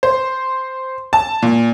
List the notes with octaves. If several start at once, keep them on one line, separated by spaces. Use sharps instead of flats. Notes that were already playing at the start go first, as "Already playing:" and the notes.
C5
A5
A#2